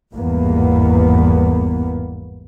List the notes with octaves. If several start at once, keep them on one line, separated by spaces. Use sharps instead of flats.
G#1 E2 G2 G3 A#3 B3